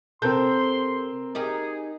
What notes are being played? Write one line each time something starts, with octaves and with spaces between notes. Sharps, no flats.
C3 C4 A4 A#4 C6 G6
D#4 G4 G#4 A#4